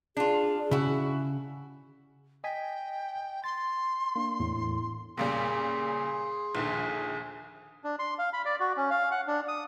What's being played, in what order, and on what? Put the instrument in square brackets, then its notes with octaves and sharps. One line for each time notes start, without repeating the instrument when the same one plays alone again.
[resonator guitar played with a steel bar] D4 F4 [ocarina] G#4
[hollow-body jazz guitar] C#3 [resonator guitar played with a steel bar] E4 F#4
[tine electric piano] D#5 G#5 B6 [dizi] G5
[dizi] C6 [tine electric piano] A6
[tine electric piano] A#3 D4
E2 A2
[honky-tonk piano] A#2 C#3 G3 [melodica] G#4 [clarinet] C6
[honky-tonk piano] A#1 D#2 D3
[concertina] D4
C6
F5
B5
D5
F#4
C#4
F5
F#5
D4
D#6